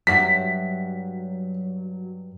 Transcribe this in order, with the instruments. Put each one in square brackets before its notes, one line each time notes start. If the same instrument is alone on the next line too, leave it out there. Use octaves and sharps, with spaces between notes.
[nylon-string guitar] G2 E5 F#5 [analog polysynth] F#3 [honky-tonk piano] B6